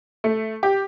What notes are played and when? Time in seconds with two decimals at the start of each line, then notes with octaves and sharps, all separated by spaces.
0.24 A3
0.63 G4